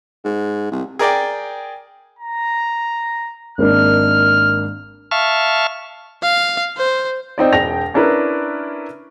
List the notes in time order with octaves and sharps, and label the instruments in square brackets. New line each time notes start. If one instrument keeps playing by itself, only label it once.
[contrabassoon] G#2
C2
[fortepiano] G#4 A#4 D5 G5
[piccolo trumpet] A#5
[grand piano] G#1 A#3 D4 [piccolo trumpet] F6
[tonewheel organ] E5 F5 A5 C#6 F6
[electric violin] F5
C5
[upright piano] C4 D#4 D5
E1 G5 A#6 F7
C#4 D4 E4 A#4 B4